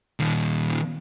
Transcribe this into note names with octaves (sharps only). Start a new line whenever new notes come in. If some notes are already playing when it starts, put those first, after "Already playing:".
A#2 D#3